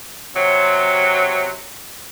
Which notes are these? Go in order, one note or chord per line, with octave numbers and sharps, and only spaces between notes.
C3 F#3